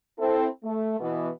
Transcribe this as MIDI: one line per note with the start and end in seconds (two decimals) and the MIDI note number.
0.19 0.47 60
0.19 0.47 64
0.19 0.47 69
0.64 0.99 57
1.00 1.29 47
1.00 1.29 52
1.00 1.29 59